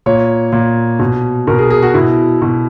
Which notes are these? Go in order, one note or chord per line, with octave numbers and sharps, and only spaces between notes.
A#2 C#5
A#2
B2
B2 A#4
G#4
G#4
F#4
B2 E4
B2